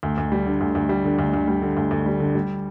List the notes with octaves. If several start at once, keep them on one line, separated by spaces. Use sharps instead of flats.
D2
D2
G3
D3
D2
D2
G3
D3
D2
D2
G3
D3
D2
D2
G3
D3
G3